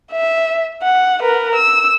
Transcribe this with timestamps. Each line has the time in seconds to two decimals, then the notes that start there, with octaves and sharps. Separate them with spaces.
0.12 E5
0.83 F#5
1.23 A#4 B4
1.55 E6